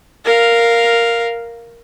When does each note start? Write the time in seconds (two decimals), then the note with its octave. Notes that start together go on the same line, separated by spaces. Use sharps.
0.25 A#4 F5